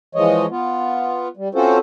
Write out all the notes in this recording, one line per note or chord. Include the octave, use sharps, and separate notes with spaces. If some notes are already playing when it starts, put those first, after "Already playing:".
E3 F3 G#3 C#5 D#5
B3 F4
G3
C4 C#4 F4 F#4 A4 C5